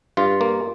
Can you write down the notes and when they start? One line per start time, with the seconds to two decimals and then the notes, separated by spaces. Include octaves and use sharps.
0.17 G2 F4
0.41 A#3